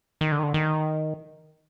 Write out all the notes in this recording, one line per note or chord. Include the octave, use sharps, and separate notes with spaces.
D#3
D3
D#3
D3
D#3